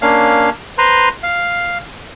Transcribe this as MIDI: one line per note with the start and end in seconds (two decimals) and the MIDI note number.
0.02 0.50 58
0.02 0.50 61
0.02 0.50 62
0.02 0.50 77
0.78 1.09 71
0.78 1.09 72
0.78 1.09 82
0.78 1.09 84
1.23 1.78 77